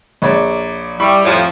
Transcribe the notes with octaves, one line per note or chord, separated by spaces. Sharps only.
A#1 C#5 D5
G3 E4 B5 C#6
F2 A2 F3